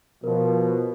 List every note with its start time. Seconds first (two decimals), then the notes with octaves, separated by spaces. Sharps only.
0.24 B2 F3 A#4